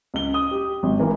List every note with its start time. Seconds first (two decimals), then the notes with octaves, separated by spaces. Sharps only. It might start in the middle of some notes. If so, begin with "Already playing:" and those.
0.14 C#2 G7
0.34 D#6
0.51 G4
0.83 G#1
0.99 E3 G#3 A#4